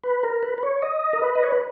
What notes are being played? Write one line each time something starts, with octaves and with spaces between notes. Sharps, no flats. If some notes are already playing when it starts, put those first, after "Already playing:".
B4
A#4
B4
B4
C#5
D#5
A#4
B4
D#5
C#5
B4